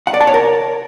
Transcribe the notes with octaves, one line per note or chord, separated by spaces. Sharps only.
F#5
D5
A5
C#5
A#4